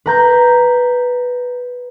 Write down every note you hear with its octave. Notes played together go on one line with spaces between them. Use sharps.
B4 A#5 G6